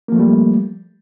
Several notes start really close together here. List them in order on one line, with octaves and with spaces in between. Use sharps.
A#3 F3 A3 G3